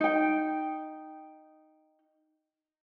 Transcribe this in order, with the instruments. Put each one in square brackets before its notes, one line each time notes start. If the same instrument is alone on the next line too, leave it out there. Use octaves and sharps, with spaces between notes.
[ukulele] D#4 G5